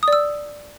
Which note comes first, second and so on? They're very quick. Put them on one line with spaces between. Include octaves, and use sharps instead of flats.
D#6 D5 E6